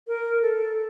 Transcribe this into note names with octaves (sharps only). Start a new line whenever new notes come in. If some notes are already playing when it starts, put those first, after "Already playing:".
A#4
A4